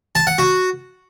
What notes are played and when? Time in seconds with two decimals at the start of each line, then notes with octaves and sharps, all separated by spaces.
0.15 A5
0.27 F#5
0.38 F#4